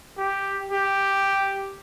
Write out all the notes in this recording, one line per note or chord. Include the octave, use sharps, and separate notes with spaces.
G4
G4